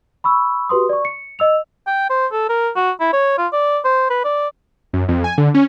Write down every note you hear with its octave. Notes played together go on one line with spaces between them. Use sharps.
B5 C#6 E6
F#4 G4 B4 C6 D#6
D5 C#6
C#7
D#5 E6 F7
G5
C5
A4
A#4
F#4
E4
C#5
F4
D5
C5
B4
D5
F#2
F2
G#5
D3
C#4